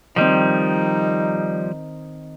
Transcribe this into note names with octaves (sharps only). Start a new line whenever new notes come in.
D#3 F3 G3 C4 D#4